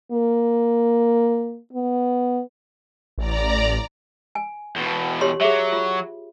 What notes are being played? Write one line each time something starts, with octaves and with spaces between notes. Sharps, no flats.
A#3
B3
A1 D5 A#5
G#5
E2 B2
G4 C#5 C6
F#3 G#4 E5
F4